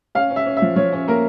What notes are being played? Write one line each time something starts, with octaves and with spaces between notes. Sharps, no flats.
C#4 F5
C#4
E5
C#4
E5
F3
F3 C#5
C#4
A#3 A#4